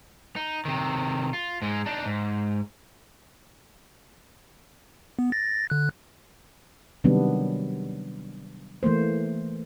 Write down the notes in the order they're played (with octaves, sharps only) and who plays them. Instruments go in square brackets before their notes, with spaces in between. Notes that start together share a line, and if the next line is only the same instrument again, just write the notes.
[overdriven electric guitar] D#4
C3 D#3
F4
G#2 G#3
D4 D#4
G#2
[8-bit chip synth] B3
A6 A#6
D3 F#6
[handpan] C3 D#3 F#3 G3 B3 D4
E3 A3 A#3 C5